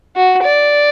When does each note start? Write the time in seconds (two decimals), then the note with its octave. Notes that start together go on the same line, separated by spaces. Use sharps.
0.16 F#4
0.44 D5